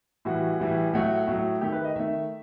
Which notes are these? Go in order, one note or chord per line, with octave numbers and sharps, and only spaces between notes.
A2 E3 G3 F#4
A2 E3 G3
A2 F#3 A3 F#4
A2 F#3 A3
D#3 A3 G4
B4
D#5
D#3 A3 E5